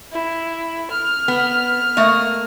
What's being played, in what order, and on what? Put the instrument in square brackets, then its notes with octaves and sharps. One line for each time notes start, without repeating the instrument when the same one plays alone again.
[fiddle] E4
F6
[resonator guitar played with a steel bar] B3
A3 A#3 D#5